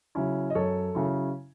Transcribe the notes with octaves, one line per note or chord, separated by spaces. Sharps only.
C#3 F#3 C#4 E4
D#5
F#2 A4 C#5
C#3 F#3 C#4 E4